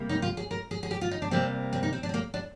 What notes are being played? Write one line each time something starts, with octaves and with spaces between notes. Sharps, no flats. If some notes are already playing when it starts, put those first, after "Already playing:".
Already playing: C3 G3 A#3
D#4
F4
G#4
A#4
G#4
G#4
G4
F4
D#4
D4
C3 G3 A#3 C4
C4
D#4
C4
D4
C4
A#3
D4